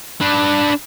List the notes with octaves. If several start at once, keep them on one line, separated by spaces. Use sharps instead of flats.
D4 B4